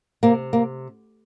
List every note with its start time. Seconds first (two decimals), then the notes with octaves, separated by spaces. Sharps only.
0.23 C3 A#3
0.53 A#3